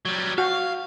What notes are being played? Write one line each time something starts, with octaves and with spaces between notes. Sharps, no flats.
F#3 G3
F#4 F5